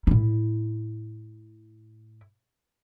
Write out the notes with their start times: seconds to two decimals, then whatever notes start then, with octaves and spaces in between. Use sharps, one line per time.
0.07 A2 E4